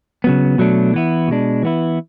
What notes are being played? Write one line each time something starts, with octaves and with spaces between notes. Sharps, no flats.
C#3 F#3 B3
B2 F#3 A3 D4
E3 B3 E4
B2 G#3 D4
E3 B3 E4